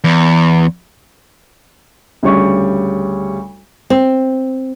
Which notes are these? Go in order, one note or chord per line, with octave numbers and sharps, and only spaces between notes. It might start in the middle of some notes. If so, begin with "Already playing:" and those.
E2
D2 C#3 G3 C#5 C#6
C4